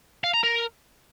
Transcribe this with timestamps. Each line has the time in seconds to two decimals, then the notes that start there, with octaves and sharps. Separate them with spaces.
0.24 F5
0.34 A#5
0.44 A#4